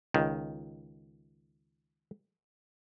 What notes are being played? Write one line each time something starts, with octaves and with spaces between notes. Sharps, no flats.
C#2 D#3